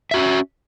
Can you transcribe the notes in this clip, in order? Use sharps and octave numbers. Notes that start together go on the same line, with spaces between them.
C#4 F#4 E5